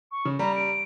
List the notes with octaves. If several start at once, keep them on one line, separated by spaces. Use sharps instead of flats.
C#6
C#3
G3 A#5
D7